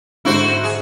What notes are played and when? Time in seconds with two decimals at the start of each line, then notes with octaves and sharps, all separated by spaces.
0.25 G#2 D3 E4 F#4 C5
0.64 G#4